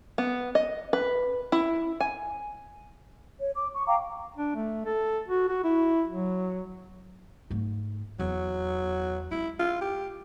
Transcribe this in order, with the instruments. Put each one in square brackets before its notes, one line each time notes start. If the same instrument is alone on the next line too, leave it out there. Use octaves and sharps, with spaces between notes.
[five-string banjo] B3
D#5
B4
E4
G#5
[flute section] C#5
D6
C#6
F5 G5 A#5 D6
[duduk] D4
A3
A4
F#4
F#4
E4
F#3
[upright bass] G#2 A3
[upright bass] E2 [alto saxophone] F#3
[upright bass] G#3 [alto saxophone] E4
[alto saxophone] F4
G4